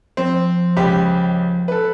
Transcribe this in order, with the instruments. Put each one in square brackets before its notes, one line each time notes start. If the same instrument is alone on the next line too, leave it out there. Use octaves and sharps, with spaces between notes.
[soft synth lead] F3 [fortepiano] C4
[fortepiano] C#2 G4 B5
A4 B4